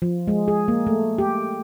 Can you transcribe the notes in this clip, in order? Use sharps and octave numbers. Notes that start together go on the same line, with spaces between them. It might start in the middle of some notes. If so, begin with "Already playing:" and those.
F3
G#3
G#4
A#3
A3
G4